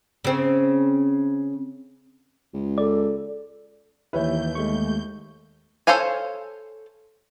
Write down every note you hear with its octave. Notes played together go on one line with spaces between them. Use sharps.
C#3 C4
C#2
A4 D5
D#2 E3 E4 B4 C#5 E5 G6
G#3 A3 C#6
A4 C5 C#5 F5 G#5